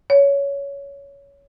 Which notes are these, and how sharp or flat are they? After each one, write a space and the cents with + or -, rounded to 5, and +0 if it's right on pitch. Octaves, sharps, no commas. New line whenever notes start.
C#5 +15